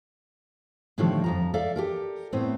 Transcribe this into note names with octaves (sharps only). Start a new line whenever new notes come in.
A2 D3 D#3 F3 G3 A3
F2 F3 A#5
A4 D5 E5 F5
G4 A4 A#4
A2 A3 B3 C4